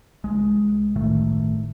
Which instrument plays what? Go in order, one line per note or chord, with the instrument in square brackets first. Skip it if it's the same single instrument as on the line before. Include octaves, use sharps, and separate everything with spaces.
[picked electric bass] C2 G#3
G1 A2 D#3 A3